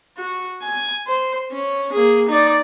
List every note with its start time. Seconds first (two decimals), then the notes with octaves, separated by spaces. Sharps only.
0.17 F#4
0.62 G#5
1.07 C5
1.51 C#4
1.93 A#3 G#4
2.29 D#4 D5